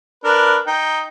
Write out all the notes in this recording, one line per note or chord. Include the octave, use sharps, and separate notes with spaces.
D4 A#4 B4
D#4 G5